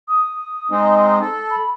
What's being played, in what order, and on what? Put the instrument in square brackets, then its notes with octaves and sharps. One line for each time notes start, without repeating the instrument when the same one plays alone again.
[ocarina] D#6
[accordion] G#3 C4 D#4
A4
[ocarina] B5